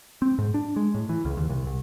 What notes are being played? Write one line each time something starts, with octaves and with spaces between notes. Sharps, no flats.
C4
G#2
D4
G#3
A2
E3
C#2
D#2
C2
C2